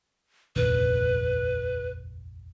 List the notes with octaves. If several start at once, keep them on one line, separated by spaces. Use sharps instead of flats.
F1 A#1 D#2 B4